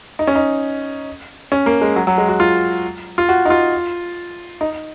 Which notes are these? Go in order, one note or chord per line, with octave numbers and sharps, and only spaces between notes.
D#4
C#4
D#4
C#4
A#3
G#3
F#3
F#3
G#3
F#4
F4
F4
F#4
D#4
F4
D#4